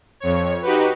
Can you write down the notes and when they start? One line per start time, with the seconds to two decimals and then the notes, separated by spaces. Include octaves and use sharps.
0.20 F2 C#5
0.62 D#4 F#4 G4 B4